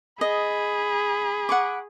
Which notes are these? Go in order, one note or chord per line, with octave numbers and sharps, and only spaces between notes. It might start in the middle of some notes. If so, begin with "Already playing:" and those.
G#4 D#5 B5
F#5 C#6 D6